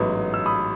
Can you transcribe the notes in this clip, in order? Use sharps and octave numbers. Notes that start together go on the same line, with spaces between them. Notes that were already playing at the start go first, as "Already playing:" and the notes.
Already playing: A1 G#2 F#3 B3 B5 D#6
E6
B5 D#6